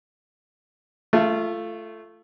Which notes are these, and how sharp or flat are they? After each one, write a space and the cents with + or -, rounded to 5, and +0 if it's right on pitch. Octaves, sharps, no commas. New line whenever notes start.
A3 +0 F4 -20